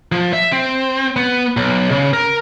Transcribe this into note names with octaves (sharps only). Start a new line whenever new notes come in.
F3
E5
C4
B3
B1
C#3
A#4